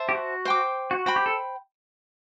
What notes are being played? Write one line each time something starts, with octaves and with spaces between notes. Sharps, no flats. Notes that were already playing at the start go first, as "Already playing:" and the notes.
Already playing: C5 E5 A5
G4
F#4
C5 G5 D6
F#4
F#4 C5 G5 B5
G4
A4